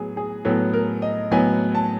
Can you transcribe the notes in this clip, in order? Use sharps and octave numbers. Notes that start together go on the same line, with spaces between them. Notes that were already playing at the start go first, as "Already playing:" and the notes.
Already playing: A2 F#3 B3 G#4
G#4
A2 F#3 B3 A4
A#4
D#5
A2 F#3 B3 G#5
A5